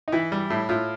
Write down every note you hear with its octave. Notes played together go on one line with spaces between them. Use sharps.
D#4
E3 E4
G3
A2
A2 F4